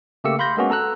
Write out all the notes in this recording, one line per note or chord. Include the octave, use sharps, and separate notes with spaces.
C#3 A3 A#3 G4 E6 C#7
F5 B5 C6 G6 A#6
G#3 A#3 B3 C#4 F#4
A4 A#5 E6 F#6